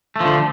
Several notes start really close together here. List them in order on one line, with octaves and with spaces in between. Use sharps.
A3 F3 D3